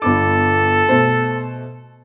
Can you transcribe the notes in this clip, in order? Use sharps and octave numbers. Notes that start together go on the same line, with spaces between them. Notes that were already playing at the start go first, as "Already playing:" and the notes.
G1 B3 A4 D6
B2 A3 C5